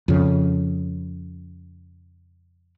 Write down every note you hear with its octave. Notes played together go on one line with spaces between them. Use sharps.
F2 C#3